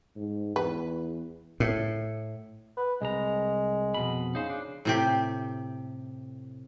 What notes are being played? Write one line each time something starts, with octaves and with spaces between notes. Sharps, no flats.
G#2
E2 B4
A2
B4
C2 G#3 A#5
F2 B2 B5
C#3 D#4 C5
D4
A2 C3 G4